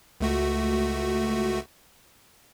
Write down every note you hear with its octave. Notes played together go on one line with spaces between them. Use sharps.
C#2 A3 F#4